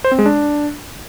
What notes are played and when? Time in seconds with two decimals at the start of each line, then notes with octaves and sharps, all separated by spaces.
0.04 C5
0.12 C4
0.19 G#3
0.26 D4